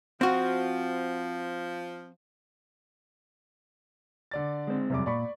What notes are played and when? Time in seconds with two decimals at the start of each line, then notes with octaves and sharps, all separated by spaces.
0.21 F3 C4 F#4
4.31 D3 D5 A6
4.67 G#3 C4
4.90 E1 F#2 C3 G3 D6
5.06 A#2 D5 B5 C#6